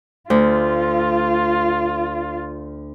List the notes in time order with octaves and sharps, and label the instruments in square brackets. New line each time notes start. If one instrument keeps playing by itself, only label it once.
[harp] D2 [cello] F4